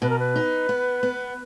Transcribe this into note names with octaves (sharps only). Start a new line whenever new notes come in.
B2 B4
A#4
B4
D#4
B3
B3